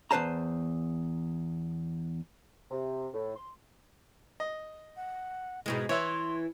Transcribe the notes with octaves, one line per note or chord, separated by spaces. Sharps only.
E2 G#3 B4 C5 A5 A#5
C3
A2
C6
D#5
F#5
G#2 B2 G#3 E4
E3 C#5 E5 C6